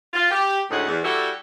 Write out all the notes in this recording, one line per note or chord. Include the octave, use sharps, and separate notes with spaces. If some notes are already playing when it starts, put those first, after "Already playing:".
F4
G4
D2 A2 G#3 D#4 F#5
E2
G3 E4 F#4 G4 A4